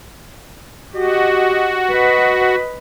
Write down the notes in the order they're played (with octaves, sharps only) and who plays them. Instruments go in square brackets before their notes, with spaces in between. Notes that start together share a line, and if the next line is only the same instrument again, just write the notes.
[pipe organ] F#4 [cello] G4 D#5
[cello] B4 D#5